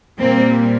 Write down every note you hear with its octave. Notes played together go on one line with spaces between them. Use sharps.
A#2 G3 A#3 C4